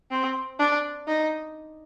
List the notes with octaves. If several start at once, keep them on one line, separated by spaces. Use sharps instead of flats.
C4
D4
D#4